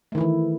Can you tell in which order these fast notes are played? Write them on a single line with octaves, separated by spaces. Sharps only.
A3 D#3 E4 E3